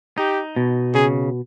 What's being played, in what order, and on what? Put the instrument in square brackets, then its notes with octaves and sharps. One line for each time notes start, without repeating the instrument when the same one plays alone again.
[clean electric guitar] D#4 [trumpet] G4
[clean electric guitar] B2
[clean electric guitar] C#3 [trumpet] G#4